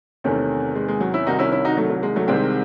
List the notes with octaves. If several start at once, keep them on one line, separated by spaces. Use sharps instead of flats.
E2 C3 D#3 A3 C#4
G#3
G#3
F#3
C#4 E4
C2 C3 D#3 D#4 F#4
C#4 E4
C#4 E4
D#4 F#4
F#3 A3
F#3
G#3
F#3 A3
C2 C3 D#3 G#3 C4